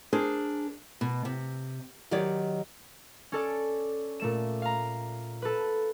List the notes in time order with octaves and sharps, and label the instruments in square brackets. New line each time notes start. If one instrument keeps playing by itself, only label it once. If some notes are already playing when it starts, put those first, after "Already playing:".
[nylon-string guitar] D4 G#4 A#4 C5
B2
C3
D#3 F#3 G4 C#5 D5
[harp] C#4 A4 D5
A#2 A3 E7
F5 A#5
A4 B4